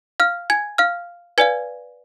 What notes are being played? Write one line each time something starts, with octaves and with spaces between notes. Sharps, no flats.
F5 F6
G#5 G#6
F5 F6
B4 D5 F5 G#5 G#6